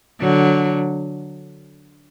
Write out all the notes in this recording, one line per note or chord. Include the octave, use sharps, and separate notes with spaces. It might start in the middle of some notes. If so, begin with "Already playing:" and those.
D3 F#3